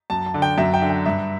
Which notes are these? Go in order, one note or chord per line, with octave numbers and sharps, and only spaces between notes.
F#2 A5
A5
D3
G5
F#2 E5
G5
D3
G5
G2 E5